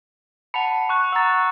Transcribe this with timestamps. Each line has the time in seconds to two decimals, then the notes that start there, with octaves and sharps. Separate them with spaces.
0.54 F#5 A5 B5 C#7 F7
0.89 C#6 F#6
1.12 F#5 A#5 E6 A6